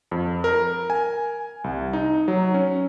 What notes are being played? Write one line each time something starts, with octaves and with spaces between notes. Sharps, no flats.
F2
A#4
G#5
C2
D#4
F#3
C#4